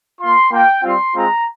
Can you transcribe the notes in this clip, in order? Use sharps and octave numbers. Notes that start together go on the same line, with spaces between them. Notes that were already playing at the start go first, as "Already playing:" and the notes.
A#3 F4 C6
A#3 F4 G5
G3 C4 F4 C6
G#3 C4 F4 A#5